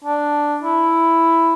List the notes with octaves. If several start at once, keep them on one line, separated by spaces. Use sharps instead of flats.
D4
E4